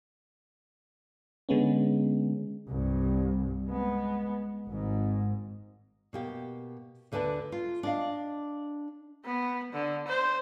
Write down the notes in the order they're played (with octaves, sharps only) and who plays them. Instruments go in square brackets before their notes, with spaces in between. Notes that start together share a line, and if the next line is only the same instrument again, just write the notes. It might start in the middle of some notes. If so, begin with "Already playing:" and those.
[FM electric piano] D3 G#3 B3 C#4
[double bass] C2 G2
G#3 B3
G#1 G#2
[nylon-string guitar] B2 A#3 G4
D2 D3 D4 B4 A5
F4
D4 D#5 F5
[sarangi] B3
D3
C5